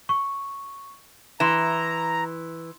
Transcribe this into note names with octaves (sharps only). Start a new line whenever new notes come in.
C#6
E3 A#5 C6 E7